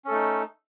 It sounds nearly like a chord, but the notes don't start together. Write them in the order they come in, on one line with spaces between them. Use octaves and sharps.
C#4 A4 A3 D#4